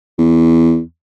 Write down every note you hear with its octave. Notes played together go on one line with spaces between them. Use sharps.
E2